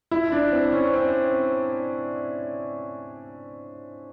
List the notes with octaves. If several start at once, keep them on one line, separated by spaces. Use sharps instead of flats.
E4
D4
C4
C#4
C4